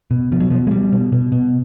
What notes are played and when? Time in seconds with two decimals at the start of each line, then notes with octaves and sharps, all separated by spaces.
0.11 B2
0.32 B2 F3
0.40 F#3
0.50 B2 F3
0.67 G#3
0.71 B2 G3
0.92 B2
1.12 B2
1.32 B2